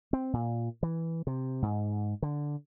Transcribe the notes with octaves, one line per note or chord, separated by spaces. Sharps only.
C4
A#2
E3
C3
G#2
D3